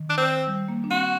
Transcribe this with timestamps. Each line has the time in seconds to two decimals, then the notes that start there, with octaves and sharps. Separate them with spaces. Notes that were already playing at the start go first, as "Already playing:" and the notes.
Already playing: D#3
0.10 D4
0.17 C4
0.47 G3
0.68 A#3
0.84 D4
0.91 C4 F#4